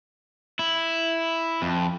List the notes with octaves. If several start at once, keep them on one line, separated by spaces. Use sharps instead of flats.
E4
F2